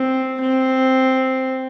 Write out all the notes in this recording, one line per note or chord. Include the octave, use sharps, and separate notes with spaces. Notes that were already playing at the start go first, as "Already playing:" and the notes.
Already playing: C4
C4